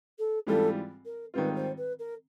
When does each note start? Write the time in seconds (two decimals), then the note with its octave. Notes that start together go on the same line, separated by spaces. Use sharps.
0.18 A4
0.47 G#2 E3 G3 C4 F4 A4
1.05 A#4
1.34 G#2 D#3 G3 C4 F4 B4
1.56 C5
1.77 B4
1.99 A#4